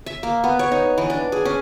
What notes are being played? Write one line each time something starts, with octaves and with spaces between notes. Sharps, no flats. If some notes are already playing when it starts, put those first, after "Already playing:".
E5
A#3
B3
C#5
D#4
E3
D4
G#4
C#4